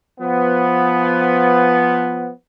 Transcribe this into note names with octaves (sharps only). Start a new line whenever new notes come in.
F3 B3